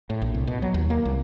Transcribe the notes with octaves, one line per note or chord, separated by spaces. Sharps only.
A2
A#1
C2
B2
F#3
D#2
A#3
C2